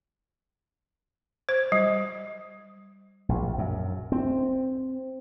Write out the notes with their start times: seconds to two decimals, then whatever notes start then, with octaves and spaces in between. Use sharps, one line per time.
1.49 C5
1.72 G3
3.29 A#1
3.58 F#2
4.12 C4